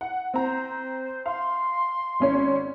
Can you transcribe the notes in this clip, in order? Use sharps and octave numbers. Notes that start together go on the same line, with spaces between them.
F#5
C4 C5 A#5
F5 C6
G#1 C#4 C#5